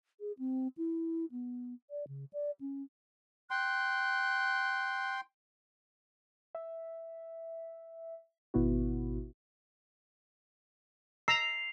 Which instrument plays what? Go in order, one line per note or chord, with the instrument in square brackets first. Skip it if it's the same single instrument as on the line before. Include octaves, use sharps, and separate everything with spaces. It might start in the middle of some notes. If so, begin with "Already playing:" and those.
[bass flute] G#4
C4
E4
B3
D5
C#3
D5
C#4
[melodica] G5 C6 [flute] F#6
[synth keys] E5
G#1 B2 B3 E4 F#4
[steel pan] A#5 E6 [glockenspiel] C7 F7